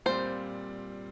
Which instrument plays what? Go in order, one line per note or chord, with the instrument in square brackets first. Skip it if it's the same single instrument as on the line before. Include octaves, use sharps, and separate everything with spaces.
[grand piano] A#2 G3 C4 F4 [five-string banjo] C5